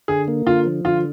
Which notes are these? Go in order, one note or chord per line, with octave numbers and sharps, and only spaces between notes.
D3 G#4
A#3
D3 F4
F3
D3 F4